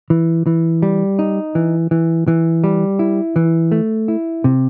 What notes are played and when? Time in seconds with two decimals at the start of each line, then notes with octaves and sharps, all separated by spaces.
0.10 E3
0.47 E3
0.83 G3
1.19 D#4
1.55 E3
1.91 E3
2.28 E3
2.64 G3
2.99 E4
3.36 E3
3.72 A3
4.08 E4
4.44 C3